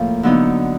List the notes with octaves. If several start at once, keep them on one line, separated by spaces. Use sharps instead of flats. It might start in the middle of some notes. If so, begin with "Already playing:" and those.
Already playing: A2 F3 A#3
D3 F#3 B3 D#4